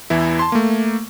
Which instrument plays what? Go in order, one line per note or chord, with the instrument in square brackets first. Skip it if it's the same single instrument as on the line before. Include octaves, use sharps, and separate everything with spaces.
[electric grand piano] E2 E3 E4
A5 C6
A3 A#3